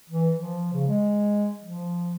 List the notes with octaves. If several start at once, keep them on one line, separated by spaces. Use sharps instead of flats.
E3
F3
C#3
G#3
F3